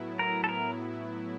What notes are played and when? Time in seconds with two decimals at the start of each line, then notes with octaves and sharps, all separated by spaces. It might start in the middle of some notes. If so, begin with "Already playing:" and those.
Already playing: A2 F#3 B3 E4
0.19 A#4
0.44 A4
0.49 A#4